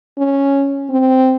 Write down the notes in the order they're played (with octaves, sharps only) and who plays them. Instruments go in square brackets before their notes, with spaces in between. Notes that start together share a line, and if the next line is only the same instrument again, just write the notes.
[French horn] C#4
C4